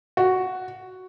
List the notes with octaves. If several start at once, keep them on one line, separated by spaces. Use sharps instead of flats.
F#4